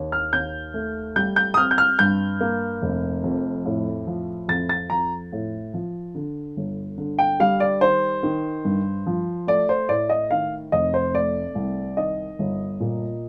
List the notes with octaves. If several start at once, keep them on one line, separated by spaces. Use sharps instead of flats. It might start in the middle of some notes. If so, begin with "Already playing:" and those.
Already playing: D#2
F6
D#2 G6
A3
G3 G6
G6
D#6
C4 F6
G6
F6
G2 G6
A#3
F1
F2
A2
F3
F2 A6
A6
F2 A#5
A2
F3
D3
G1
D3
G5
G3 F5
D5
D#3 C5
D#3
G2
F3
A3 D5
C5
A2 D5
D#5
D#3 F5
F1 D#5
C5
A3 D5
C2
D#3 D#5
G1
A#2